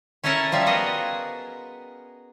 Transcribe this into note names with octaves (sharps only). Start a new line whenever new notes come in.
C#4 E4 A4 A#4 G#5 A5
F3 G3 F4 E5
B3 F#4 G#4 A#4 D#5